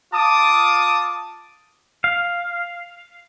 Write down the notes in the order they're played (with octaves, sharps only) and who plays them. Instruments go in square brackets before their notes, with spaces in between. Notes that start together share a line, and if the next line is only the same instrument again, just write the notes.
[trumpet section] F4 A5 D6 D#6
[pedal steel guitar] F5